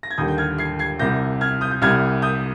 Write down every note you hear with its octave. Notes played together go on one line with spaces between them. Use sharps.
A#6
G#6
D#2 D3 G3 D#6 G6
G6
F6 G#6
G#6 C7
G#6 C7
C2 C3 G3 G6 A#6
F6 G#6
D#6 G6
G6
C2 C3 G3 F6 G#6
D#6 G6